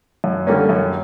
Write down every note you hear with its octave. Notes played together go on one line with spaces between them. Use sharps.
F#2
D3 G3 A#3 C#4
F#2